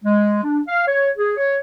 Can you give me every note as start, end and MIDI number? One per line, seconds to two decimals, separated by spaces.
0.04 0.42 56
0.44 0.60 62
0.67 0.85 77
0.87 1.09 73
1.17 1.32 68
1.36 1.57 73